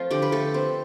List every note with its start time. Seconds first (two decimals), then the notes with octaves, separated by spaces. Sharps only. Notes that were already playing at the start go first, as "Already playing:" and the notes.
Already playing: F3 A3 C4 F4
0.11 D3 G4
0.22 B4
0.32 A3 A4
0.54 C4